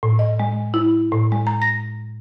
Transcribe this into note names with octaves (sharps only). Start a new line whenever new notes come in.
A2
D#5
G#3
E4
A2
G#3
A#5
A#6